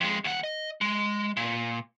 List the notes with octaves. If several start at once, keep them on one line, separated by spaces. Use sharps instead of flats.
F2 G#3
D#2 F#5
D#5
G#3
A#2